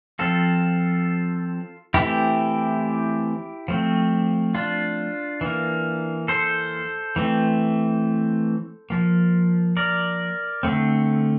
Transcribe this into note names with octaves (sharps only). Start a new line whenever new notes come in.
F3 C4 F4 A4
E3 A3 C4 E4 G4
F3 A3 C4
D4 F4
E3 A#3
A4 C5
E3 A3 C4
F3 A#3
A#4 D5
D3 A3 C4